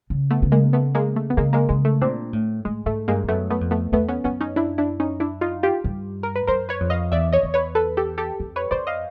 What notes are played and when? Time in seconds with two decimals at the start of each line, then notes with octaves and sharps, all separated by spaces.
0.10 C#3
0.31 A3 B3
0.42 C#3
0.52 G#3 A#3
0.73 A3 B3
0.95 G#3 A#3
1.16 A3
1.30 B3
1.37 C#3 G#3 A#3
1.53 G#3 A#3
1.69 C#3 G#3
1.85 A3
2.01 A#2 C4 D4
2.33 A2
2.65 A2 G#3
2.86 G#2 A3
3.08 G2 G#3 A#3
3.24 G2
3.28 F#2 A3 B3
3.50 A3 B3
3.61 F2
3.71 A3 B3
3.92 E2 A3 B3
4.08 B3 C#4
4.24 F#2 B3 C#4
4.40 C#4 D#4
4.56 D4 E4
4.78 D4 E4
5.00 C#4 D#4
5.20 D4 E4
5.41 D#4 F4
5.63 F4 G4
5.84 G2
6.23 A#4
6.35 B4
6.47 F#2 A#4 C5
6.69 B4 C#5
6.80 F2
6.90 D#5 F5
7.11 E2 D5 E5
7.33 C#5 D#5
7.43 E2
7.54 B4 C#5
7.75 A4 B4
7.97 G4 A4
8.18 G4 A4
8.40 F2
8.56 B4 C#5
8.71 F2 C5 D5
8.87 D#5 F5